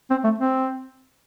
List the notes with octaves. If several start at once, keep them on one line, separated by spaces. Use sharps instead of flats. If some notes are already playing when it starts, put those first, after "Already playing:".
C4
A3
C4